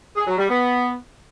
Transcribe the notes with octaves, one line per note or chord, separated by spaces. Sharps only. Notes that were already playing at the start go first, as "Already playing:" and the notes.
G#4
F#3
G3
B3